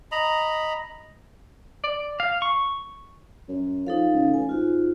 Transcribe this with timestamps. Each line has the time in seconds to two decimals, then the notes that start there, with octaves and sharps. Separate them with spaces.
0.12 D#5 A#5 B5
1.84 D5
2.20 F5
2.42 C#6
3.48 F#2
3.87 F3 D#4 A4 F5
4.13 C#2
4.34 A1 G#5
4.49 G#2 F4 F#4